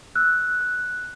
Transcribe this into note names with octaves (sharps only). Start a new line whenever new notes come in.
E6 F#6
F#6